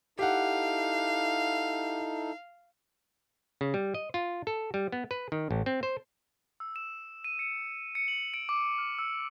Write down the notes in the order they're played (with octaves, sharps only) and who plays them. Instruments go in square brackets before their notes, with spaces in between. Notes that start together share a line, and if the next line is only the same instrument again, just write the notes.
[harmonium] D#4 E4 A4 [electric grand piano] G4 F#5 [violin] F5
[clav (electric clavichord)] C#3
G3
D#5
F4
A4
G3
B3
B4
D#3
A1
C4
C5
[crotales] E6
E7
D#7
C#7
C#7
F#7
D7
D6
F6
E6